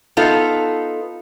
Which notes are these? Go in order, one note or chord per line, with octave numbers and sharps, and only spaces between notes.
B3 D#4 F4 A4